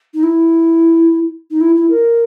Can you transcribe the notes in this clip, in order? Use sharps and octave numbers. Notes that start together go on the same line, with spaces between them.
D#4
E4
D#4
E4
E4
A#4